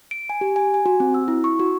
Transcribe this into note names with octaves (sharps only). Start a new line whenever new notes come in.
D7
G#5
G4
G#5
G#5
F#4
C4
E6
E4
C#6
F#4